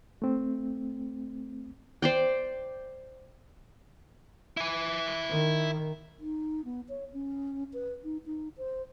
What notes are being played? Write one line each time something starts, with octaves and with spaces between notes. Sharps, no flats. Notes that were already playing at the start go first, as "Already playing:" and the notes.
A3 C4
C5 D5 G5
E4 G#5
D#3
D#4
B3
C#5
C#4
B4
D#4
D#4
C5